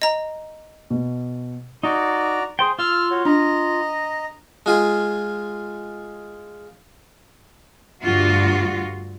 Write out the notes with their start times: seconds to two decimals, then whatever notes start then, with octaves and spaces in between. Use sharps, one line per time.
0.02 D#5 A#5
0.90 B2
1.83 D#4 F#4 D5 A#5
2.59 G#4 C5 G5
2.79 F4 F5 E6 F6
3.10 F#4 C#5
3.25 D4 D#5 A#5
4.66 G#3 F4 G#4
8.02 D2 G2 F4 F#4